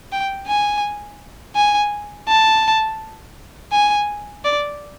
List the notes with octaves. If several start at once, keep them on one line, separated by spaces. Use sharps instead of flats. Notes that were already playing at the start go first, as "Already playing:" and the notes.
G5
G#5
G#5
A5
G#5
D5